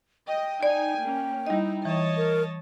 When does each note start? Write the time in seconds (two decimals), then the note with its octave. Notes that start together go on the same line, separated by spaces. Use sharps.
0.28 D#5 G5
0.63 D#4 D5 G#5
1.02 A#3 C#4
1.47 G3 D#4 E4 D#5
1.85 E3 C#5 D#5 A5
2.17 A#4